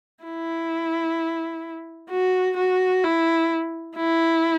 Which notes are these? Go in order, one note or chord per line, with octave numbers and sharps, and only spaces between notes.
E4
F#4
F#4
E4
E4